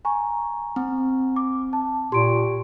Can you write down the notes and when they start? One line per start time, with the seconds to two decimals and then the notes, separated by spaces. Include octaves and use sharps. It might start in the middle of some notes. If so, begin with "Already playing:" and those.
0.05 G#5 A#5 C#6
0.76 C4
1.36 D6
1.73 A5
2.12 A#2 G4 C6 D7